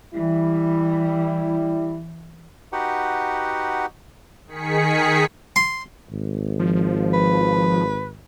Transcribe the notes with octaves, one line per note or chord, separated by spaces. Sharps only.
E3 G3 E4
D#4 F#4 G4 B4 F#5
D#3 G#4 B6 C#7
C6
G#1
F3
B4